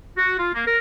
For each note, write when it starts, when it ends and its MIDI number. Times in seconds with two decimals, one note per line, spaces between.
0.17 0.35 66
0.38 0.53 65
0.54 0.65 58
0.67 0.79 70